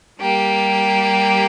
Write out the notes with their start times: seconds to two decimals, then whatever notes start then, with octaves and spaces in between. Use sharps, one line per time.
0.20 G3 A#3 G4